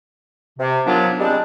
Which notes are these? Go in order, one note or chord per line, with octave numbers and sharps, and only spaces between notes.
C3
D#3 F3 F#3 B3 D4 F4
G3 G#3 C4 D4